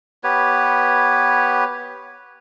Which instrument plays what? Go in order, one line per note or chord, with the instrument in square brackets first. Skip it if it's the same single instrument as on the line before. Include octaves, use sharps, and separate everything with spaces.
[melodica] B3 G4 B4 C#5